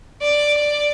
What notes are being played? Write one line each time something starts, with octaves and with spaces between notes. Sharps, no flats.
D5
D5